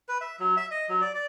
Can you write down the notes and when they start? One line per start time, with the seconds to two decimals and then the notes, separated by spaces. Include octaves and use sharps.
0.08 B4
0.21 E5
0.40 F#3
0.57 E5
0.71 D#5
0.89 F#3
1.01 D5
1.15 D5